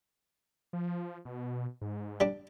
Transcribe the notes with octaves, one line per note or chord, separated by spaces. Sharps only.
F3
B2
G#2
G3 D4